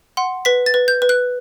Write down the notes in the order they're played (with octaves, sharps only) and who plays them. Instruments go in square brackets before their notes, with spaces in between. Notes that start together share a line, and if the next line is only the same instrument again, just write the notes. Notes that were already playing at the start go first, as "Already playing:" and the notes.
[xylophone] F#5 C6
B4 B6
A6
B4
G6
B4
F#6